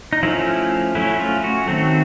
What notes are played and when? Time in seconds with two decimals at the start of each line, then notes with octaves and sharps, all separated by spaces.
0.13 D#4
0.23 F3 A3 C#4 E4
0.95 F#3 A3 C#4 E4
1.20 F4
1.44 F#4
1.68 D#3 F#3 A3 C4